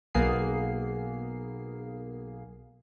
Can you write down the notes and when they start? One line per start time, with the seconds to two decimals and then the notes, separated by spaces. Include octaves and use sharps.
0.14 B1 A#3 B3 G#4 C7